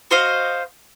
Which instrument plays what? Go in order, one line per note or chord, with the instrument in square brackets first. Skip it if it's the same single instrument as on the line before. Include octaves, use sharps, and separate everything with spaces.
[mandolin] F#4 C5 D#5 F5